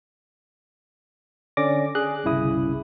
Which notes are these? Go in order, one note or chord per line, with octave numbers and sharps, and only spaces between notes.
D3 C#4 D5 D6 A#6
G#4 F#6
G1 C2 C#3 E4 D#6